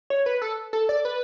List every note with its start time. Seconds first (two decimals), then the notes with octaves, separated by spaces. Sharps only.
0.10 C#5
0.26 B4
0.42 A4
0.73 A4
0.89 D5
1.05 B4